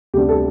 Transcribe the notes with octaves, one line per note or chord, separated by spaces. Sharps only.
D2 C3 G3 B3 D4 G4
A4